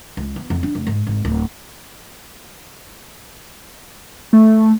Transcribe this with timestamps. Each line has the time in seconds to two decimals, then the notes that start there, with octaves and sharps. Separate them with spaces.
0.17 C#2
0.36 B3
0.50 F2
0.63 D4
0.75 F1
0.87 G#2
1.07 G#1
1.25 D1
4.33 A3